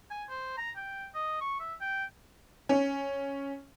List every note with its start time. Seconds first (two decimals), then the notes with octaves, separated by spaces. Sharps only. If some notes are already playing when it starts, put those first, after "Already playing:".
0.11 G#5
0.29 C5
0.57 A#5
0.76 G5
1.15 D#5
1.41 C#6
1.60 E5
1.81 G5
2.69 C#4